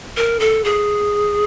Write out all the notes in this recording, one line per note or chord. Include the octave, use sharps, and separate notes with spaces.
A#4
A4
G#4